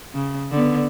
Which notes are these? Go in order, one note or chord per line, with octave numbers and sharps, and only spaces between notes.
C#3
D3 B3